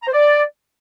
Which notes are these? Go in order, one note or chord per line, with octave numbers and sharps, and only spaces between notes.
A#5
C5
D5